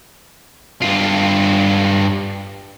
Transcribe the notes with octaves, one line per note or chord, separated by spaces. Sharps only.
G2 F4